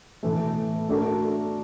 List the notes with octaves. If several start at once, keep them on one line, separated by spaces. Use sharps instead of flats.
A2 E3 A3
A3 D4 F#4 A#4